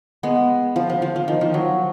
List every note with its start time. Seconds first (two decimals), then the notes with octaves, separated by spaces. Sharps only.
0.23 G#3 B3
0.76 F3
0.90 F3
1.02 F3
1.16 F3
1.28 D#3
1.41 F3
1.54 F#3